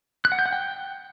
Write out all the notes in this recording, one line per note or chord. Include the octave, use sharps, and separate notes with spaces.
F#6
F#5
G6
F#5
G5